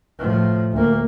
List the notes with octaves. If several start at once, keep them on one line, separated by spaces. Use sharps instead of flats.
A2 F3
D2 A#3